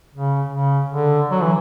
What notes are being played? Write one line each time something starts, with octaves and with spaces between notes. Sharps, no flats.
C#3
C#3
D3
F#3
E3